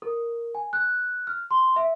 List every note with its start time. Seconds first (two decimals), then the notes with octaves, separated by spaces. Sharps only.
0.02 A#4
0.55 G#5
0.73 F#6
1.27 F6
1.51 C6
1.76 E5